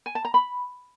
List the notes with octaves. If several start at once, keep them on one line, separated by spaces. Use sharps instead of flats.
G#5
A5
A#5
B5